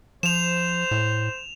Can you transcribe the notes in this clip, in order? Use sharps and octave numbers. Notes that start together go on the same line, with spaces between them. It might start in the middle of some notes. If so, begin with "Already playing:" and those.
F3 C5 E7 F7
A2